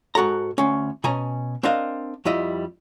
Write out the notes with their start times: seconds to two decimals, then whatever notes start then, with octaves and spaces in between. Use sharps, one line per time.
0.15 G#2 F#4 A4 A#5
0.58 D2 C#4
1.04 B2 C#4 G#5 A#5
1.63 C4 D4 A#4 D#5 F5
2.25 F2 G3 E4 D#5